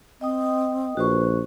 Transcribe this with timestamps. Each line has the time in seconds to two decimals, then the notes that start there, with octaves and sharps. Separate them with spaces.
0.21 C4 D#5 G5 D#6
0.97 A#1 F#4 B4 C5 C#6